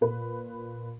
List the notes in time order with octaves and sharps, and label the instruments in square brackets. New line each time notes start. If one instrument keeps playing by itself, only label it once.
[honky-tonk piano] A#2 B4